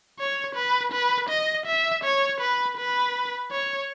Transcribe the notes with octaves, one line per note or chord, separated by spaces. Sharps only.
C#5
B4
B4
D#5
E5
C#5
B4
B4
C#5